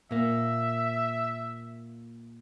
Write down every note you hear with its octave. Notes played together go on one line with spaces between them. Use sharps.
A#2 A#3 E5